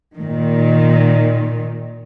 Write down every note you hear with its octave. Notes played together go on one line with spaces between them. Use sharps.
A#2 D#3